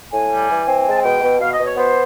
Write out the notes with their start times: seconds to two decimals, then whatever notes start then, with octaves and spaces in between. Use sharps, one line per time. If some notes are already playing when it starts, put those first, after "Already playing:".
0.12 A2 G#5
0.30 G3
0.49 E3
0.67 C4
0.86 G#3 A5
0.96 G#5
1.03 B2 G5
1.22 B2
1.40 B2 F5
1.53 D#5
1.59 B2
1.65 C#5
1.77 B3 C5